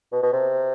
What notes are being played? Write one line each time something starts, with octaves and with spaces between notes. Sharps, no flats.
B2
B2
C3